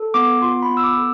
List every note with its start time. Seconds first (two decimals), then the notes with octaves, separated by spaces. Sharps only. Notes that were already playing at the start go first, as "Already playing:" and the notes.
Already playing: A4
0.14 B3 D6
0.42 F4 C6
0.62 B5
0.69 B3
0.77 E6
0.84 D6
0.97 A4